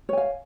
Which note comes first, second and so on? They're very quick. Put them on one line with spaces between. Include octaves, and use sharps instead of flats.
C#5 G#5 F5